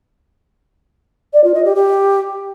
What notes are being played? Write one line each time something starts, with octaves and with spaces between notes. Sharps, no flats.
D5
F4
D#5
G4
G4